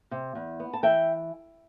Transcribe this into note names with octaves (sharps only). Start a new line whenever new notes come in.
C3
E2
B3
A5
E3 E5 G5